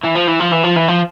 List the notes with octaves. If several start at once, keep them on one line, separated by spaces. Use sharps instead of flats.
E3
F3
E3
F3
E3
F3
E3
F3